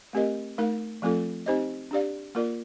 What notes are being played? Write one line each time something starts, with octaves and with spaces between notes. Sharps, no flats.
A3 C4 G4 A#4 D#5
A3 D#4 A#4 F5
F3 A3 C4 F4 A4
C4 D#4 G4 C5 D#5
D4 G4 D5 F5
A#3 F4 A#4 D5